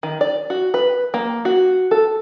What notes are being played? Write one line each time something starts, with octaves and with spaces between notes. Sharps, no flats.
D#3
D5
F#4
B4
A#3
F#4
A4